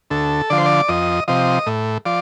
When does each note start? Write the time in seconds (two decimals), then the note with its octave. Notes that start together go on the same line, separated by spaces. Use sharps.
0.10 D2 A4
0.50 D3 F3 D5
0.58 C5
0.66 D5
0.89 F2 D#5
1.28 C3 F3 D#5
1.67 A2
2.05 F3 D5